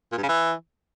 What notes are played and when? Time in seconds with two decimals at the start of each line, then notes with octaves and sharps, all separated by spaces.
0.12 A#2
0.18 G2
0.23 C#3
0.29 E3